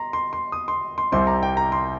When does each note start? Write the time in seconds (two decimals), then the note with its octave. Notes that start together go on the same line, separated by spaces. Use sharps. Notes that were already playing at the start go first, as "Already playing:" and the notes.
Already playing: A#5 C6
0.13 C6
0.33 C6
0.52 D#6
0.68 C6
0.98 C6
1.12 C2 C3 G3 C4 C6
1.27 A#5
1.43 G5
1.57 A#5
1.72 C6